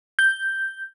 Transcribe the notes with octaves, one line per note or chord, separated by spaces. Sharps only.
G6